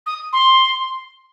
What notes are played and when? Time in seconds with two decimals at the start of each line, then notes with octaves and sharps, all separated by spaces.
0.06 D#6
0.32 C6